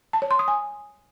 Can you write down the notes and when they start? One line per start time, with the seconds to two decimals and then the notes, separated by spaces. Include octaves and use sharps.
0.13 A5
0.22 C#5
0.31 C6
0.39 D#6
0.48 G#5